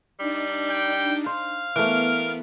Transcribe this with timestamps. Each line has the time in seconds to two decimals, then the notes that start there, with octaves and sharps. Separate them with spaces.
0.20 G3 D4 D#4
0.70 G5
1.26 C5 F5
1.76 E3 A3 B3 A#4